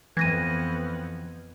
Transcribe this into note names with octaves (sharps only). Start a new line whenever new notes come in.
F2 E3 B3 G#6 A#6 D#7